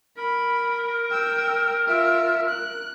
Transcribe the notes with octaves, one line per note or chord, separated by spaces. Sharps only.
A#4 B5
G5 E6
F4 E5
F#6